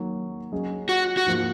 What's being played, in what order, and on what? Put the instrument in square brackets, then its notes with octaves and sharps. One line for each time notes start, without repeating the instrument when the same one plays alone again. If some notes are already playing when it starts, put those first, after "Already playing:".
Already playing: [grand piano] D#3 F#3 A#3
F#3 C#4 G#4 D#5
[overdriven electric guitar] F#4
F#4
[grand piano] G#2 F3 A#3